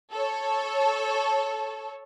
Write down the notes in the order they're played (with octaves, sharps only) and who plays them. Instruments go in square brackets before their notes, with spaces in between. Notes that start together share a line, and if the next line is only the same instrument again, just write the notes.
[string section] A4 C#5